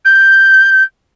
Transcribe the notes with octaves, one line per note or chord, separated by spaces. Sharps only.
G6